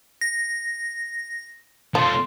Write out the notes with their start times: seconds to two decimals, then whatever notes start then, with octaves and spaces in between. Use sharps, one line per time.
0.21 A#6
1.95 F3 A3 F4 C6